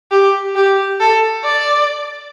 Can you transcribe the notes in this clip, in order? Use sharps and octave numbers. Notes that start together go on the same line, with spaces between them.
G4
G4
A4
D5